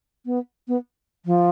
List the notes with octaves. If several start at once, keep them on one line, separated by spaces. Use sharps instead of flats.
B3
B3
F3